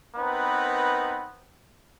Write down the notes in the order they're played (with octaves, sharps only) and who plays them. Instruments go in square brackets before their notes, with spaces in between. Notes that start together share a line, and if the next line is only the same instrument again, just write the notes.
[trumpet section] B3 C4 D#4 A#4 B4